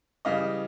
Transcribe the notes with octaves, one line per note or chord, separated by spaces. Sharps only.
C#3 E3 G3 D#5 F5